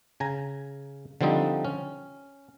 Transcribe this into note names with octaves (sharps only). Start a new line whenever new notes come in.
C#3 G#5 A#5
D3 F3 G3 C4 D#4
C#4